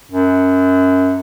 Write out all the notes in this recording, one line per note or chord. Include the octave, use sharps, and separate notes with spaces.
F#2